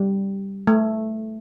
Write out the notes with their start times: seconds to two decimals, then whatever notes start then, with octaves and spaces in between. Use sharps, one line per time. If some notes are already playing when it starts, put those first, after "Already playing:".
Already playing: G3
0.67 A3